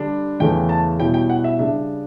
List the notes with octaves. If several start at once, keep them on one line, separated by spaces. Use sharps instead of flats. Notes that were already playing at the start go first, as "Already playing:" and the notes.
Already playing: D3 G3 D4
E2 C#3 E3 A3 C#4 G5
A5
B2 G3 C#4 E4 G5
G5
F#5
E5
C#3 G3 D4 E5